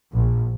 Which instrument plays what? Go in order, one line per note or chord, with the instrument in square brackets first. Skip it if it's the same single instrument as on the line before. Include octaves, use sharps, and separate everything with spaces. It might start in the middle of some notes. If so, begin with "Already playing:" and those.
[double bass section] A#1